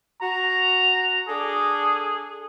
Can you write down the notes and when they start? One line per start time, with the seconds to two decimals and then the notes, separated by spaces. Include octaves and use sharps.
0.22 F#4 A#5
1.28 D4 G#4 A4